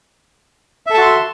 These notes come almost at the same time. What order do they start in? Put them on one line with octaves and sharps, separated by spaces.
E5 A4 A5 F#4 C6